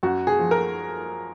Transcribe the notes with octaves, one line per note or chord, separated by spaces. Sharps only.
F#2 F#4
G#4
F3
A#4